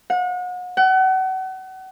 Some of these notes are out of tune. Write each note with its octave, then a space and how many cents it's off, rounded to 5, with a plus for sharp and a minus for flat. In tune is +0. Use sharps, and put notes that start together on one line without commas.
F#5 -35
F#5 +35